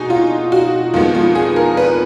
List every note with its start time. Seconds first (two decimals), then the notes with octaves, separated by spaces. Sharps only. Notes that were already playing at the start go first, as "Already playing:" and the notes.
Already playing: B2 D#4 F#4 G#4
0.10 F4
0.52 F#4
0.94 F2 D#3 G#3 B3 F4
1.15 F4
1.35 G#4
1.56 A#4
1.77 B4